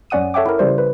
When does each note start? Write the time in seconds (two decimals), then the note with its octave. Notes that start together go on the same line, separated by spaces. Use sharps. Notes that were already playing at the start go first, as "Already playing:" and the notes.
0.10 F#2 C#4 D5 F#5 D#6 D#7
0.34 A4 C#5 E5 F#5 G5 D6
0.46 E4 A#4
0.59 C#3 E3 G3 C5
0.78 B4